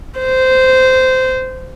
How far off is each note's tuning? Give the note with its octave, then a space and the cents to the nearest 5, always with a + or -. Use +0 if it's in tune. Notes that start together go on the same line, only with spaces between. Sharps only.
C5 -15